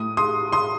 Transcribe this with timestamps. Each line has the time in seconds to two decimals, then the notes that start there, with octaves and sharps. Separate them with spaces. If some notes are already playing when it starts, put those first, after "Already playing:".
Already playing: A2 D#6
0.17 C6 D#6
0.52 C6 D#6